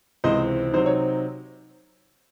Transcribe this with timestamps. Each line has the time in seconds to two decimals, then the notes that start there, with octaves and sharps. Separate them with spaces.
0.24 C#2 C3 E3 C4 C5 D#5
0.73 C3 F#3 C4 D#4 C5
0.86 C#5